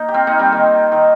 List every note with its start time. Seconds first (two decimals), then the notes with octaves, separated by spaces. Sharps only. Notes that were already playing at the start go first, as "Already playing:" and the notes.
Already playing: A#3 D#4
0.08 G4
0.14 C4 F4
0.27 A#3 D#4
0.39 G3 C4
0.52 D#3
0.92 D#3